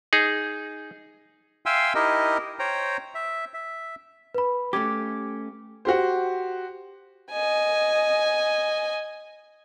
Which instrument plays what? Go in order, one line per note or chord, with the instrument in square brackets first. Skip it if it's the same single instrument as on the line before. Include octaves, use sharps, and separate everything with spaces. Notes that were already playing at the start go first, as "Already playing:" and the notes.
[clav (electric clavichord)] D#4 G#4
[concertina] E5 F5 G5 G#5 C6 E6
D#4 E4 G4 A#4 D#5
C5 C#5 G5 A#5
E5
E5
[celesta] B4 B5
[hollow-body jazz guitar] A3 C#4 G4 [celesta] D6 G#6
[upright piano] F#4 G4 C5
[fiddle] D#5 G#5